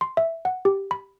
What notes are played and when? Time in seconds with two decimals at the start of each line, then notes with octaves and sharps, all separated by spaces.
0.01 C6
0.17 E5
0.45 F#5
0.65 G4
0.91 B5